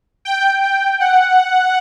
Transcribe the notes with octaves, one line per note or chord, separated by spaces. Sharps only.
G5
G5
F#5